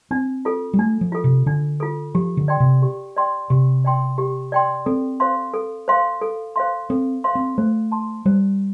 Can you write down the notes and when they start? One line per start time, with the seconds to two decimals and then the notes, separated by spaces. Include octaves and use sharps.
0.11 C4 D4
0.45 F4 A4
0.74 G3
0.79 A3 D4
1.01 F3
1.12 F4 A4
1.24 C3
1.46 D3 D4
1.80 F4 A4
2.15 F3 G4
2.37 D3
2.48 D5 G5 C6
2.60 C3
2.82 G4
3.16 D5 G5 C6
3.50 C3 G4
3.84 D5 G5 C6
4.18 G4
4.52 D5 G5 C6
4.86 C4 A4
5.20 C5 F5 C6
5.54 A4
5.88 C5 F5 C6
6.21 A4
6.56 C5 F5 C6
6.90 C4 A4
7.24 C5 F5 C6
7.35 C4
7.58 A3 C5
7.92 A5 C6
8.25 G3 C5